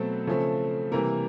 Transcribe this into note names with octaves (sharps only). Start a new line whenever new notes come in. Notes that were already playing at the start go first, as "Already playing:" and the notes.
Already playing: B2 F#3 A3 C4 A4
C#3 F3 A3 C4
C3 E3 G3 A#3 A#4